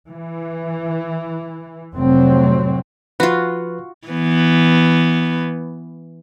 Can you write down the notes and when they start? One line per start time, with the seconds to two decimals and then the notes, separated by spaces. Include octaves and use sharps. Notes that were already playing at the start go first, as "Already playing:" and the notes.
0.10 E3
1.94 F1 A2 F#3 C4
3.20 F3 F4 F#4 B4
4.08 E3 B3